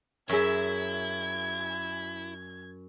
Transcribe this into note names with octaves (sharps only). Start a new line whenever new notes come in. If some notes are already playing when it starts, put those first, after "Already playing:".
F#2 E4 G#4 E5 C#6 G#6